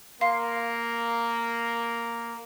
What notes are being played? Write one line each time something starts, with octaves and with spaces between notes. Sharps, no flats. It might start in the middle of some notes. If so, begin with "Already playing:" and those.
A#3 F5 C6 C7